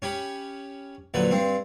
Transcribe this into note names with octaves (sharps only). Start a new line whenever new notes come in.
C#4 G4 B5
A#1 D3 F#3 B4
G2 C4